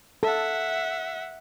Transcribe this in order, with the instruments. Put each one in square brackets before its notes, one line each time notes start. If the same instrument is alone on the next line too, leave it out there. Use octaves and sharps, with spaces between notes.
[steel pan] A4 [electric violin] E5 F#5